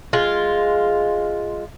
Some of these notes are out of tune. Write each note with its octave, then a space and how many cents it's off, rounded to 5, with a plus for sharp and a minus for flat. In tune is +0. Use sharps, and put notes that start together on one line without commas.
G#3 +0 F4 +0